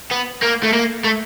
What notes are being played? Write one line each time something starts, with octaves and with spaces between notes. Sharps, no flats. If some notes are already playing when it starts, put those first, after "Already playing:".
B3
A#3
A3
A#3
A3